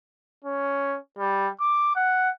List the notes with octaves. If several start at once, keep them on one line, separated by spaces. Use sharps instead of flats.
C#4
G3
D6
F#5